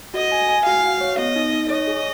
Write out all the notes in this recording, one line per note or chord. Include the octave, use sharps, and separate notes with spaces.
F#4 D#5
G#5
G#5
F#4 F5
F#4
C#5
B3 D#5
D#4
D#4
C#5 D#5
G#4